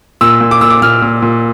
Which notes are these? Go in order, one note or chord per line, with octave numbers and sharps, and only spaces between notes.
A#2 E6
A#2
D6
A#2 E6
D6
A#2 F6
A#2
A#2